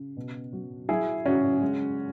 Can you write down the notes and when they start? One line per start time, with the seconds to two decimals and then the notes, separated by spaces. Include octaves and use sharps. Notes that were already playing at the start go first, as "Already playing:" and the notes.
Already playing: C#3
0.17 B2
0.53 F#3
0.89 F#3 E4 G#4
1.26 C#3 C#4 F#4
1.62 G#3